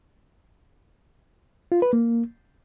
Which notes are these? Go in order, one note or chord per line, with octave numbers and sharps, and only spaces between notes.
F4
B4
A#3